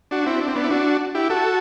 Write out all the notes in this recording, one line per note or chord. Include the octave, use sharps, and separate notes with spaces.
D4 F#4
C4 E4
D4
C4
B3 D4
E4
D4 F#4
E4 G4
F#4 A4